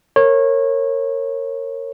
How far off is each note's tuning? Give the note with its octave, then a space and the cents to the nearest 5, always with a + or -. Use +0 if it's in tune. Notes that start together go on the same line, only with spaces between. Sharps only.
A#4 -15 C#5 -25